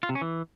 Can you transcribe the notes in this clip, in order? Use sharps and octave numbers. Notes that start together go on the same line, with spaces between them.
F4
C3
C#4
E3